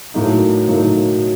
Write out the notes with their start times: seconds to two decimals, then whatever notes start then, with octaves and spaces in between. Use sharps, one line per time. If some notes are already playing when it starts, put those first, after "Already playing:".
0.14 A2 F#3 A#3 D#4
0.68 A2 F#3 A#3 D#4